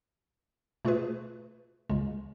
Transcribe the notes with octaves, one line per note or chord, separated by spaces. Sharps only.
B2 A3 F4 G#4 B4
C#2 C#3 G#3